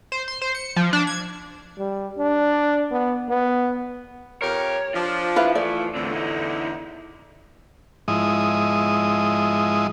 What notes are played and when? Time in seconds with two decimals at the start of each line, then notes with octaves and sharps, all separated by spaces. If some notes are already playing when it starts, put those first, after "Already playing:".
0.12 C5
0.28 C6
0.42 C5
0.55 C#7
0.76 F3
0.93 D4
1.07 G#6
1.78 G3
2.18 D4
2.91 B3
3.29 B3
4.42 F2 G4 A#4 C#5
4.94 F3 D4 F4 C5
5.36 E4 B4 F5
5.55 E3 A3 D5
5.94 E2 A2 D3 A3 C4
6.12 D#4 E4
8.08 G#2 F3 G#3 E4 D#5 D#6